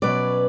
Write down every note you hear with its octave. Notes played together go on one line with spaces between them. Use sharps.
B2 F#3 C#4 B4 D5